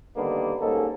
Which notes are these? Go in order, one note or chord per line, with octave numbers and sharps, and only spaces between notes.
D3 D#3 G3 A#3 B3 D4
G#2 G3 A#3 C#4 D#4 A4